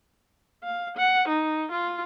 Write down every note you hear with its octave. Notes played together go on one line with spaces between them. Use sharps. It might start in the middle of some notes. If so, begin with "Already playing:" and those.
F5
F#5
D#4
F4